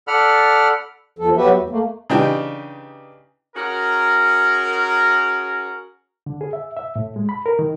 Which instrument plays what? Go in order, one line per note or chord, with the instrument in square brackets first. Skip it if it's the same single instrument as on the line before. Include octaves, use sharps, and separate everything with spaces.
[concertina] A4 D5 F#5 B5 F6
[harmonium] E2 F3 A4
F#3 B3 F#4 G4 B4 E5
E2
A3 A#3
[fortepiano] C#3 E3 D4 D#4 G4
[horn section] C#4 F#4 G#4 A#4
[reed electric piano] D3
G#4
E5
E5
A2
G#3
B5
A#4
D#3